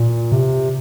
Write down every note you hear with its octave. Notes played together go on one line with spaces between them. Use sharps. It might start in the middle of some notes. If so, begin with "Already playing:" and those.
Already playing: A#2
C3